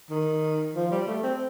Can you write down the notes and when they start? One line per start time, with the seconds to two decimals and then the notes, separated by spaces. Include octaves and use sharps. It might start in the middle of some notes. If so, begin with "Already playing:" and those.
0.11 D#3
0.75 F3
0.91 G3
1.08 A3
1.23 C4